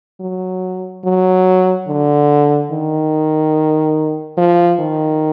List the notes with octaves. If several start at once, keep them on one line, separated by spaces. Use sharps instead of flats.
F#3
F#3
D3
D#3
F3
D#3